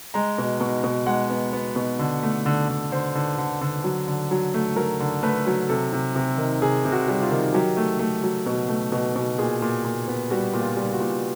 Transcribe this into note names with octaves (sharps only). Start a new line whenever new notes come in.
G#3 A#5
B2
B2
B2
G#3 F#5
B3
B3
B2
D3
A3
D3
D3
D3 C5
D3
D3
D3
F#3
D3
F#3
A3
F#3 A#4
D3
A3 B4
F#3
C3 A4
C3
C3
D#3
C3 G#4
C3
F#4
G3
F4
D#3
F#3 G4
A3
A3
F#3
B2
A3
B2
B2
A#2 G#4
A#2
A#2
B3
G3 F#4
A#2
F4
G3
F#4
A#2